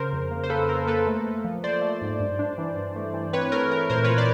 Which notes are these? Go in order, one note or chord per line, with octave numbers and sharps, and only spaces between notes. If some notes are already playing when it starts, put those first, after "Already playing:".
Already playing: C#3 A#4 C5
F2
A#3
C5
A#3 A4 B4
A#3 A#4
A#3 A4 B4
A3
A3
F3
A3 C5 D5
A3
G#2
G2
D4
E3
G2
A3
E3
C4 B4 C#5
A3 A#4
A3 A#4
A#2 A#4 C5
A#2 B4 C#5
C5 D5